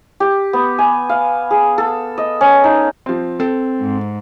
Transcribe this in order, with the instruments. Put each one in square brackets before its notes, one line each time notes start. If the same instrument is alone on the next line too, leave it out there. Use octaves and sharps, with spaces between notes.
[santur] G4
B3
G#5
F5
G#4
A4
D#5
C#4
D#4
[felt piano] F3 C4
[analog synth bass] C4 [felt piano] A4
[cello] G#2